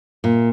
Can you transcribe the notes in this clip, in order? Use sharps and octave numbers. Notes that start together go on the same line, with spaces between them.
A#2